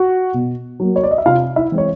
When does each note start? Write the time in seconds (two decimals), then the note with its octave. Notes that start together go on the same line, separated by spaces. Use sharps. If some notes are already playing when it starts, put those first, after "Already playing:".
Already playing: F#4 F#5
0.34 B2
0.80 F#3 A#3
0.96 C#5
1.03 D5
1.11 D#5
1.18 E5
1.26 C3 F4 F5
1.56 E4 E5
1.72 E3 G#3 C4
1.78 C#5